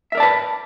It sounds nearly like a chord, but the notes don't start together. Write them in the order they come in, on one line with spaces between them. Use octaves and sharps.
E5 A#4 D5 A5 B4